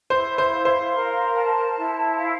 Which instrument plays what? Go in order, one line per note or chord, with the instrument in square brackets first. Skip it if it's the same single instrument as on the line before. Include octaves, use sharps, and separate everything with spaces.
[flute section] E4 [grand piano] C5
[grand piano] C5
[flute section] F5
[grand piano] C5
[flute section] A#4
A5
E4
F5